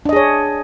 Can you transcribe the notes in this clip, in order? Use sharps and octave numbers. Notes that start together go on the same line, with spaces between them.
D4 G#4 C#5 D#5